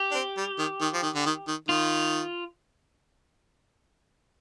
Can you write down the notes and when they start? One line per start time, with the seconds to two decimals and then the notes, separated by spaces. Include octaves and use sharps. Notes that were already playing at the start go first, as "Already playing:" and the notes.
Already playing: G4
0.11 D4
0.14 C4
0.37 G3
0.58 D#3
0.81 D#3
0.94 F3
1.03 D#3
1.15 D3
1.26 D#3
1.48 D#3
1.68 D#3 F4